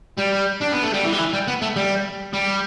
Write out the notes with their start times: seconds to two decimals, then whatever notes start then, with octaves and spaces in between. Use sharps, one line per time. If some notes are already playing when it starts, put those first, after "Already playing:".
0.18 G3
0.62 D4
0.73 B3
0.83 A3
0.94 G3
1.05 E3
1.13 G3
1.19 E3
1.33 G3
1.48 B3
1.62 A3
1.76 G3
2.33 G3